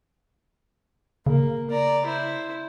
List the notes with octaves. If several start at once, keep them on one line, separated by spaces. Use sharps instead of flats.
C#3 A#3
D5 A#5
E4 C5